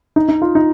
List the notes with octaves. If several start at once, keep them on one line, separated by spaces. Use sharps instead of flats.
D#4
D#4
F4
D#4